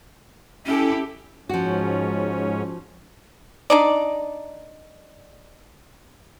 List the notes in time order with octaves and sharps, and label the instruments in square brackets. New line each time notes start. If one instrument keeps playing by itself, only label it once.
[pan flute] C#4 [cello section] E4 G4 A4
[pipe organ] G#2 C#4 [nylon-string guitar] F3 F#4
[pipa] D4 D#4 D5